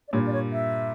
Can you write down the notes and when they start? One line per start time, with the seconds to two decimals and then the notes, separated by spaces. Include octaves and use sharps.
0.08 D5
0.12 G2 A#2 C#5
0.27 D5
0.33 C#5
0.52 E5